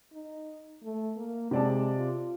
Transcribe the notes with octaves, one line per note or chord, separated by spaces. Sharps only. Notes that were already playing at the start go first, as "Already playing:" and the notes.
D#4
A3
A#3
C3 G#3 D5 A5
F4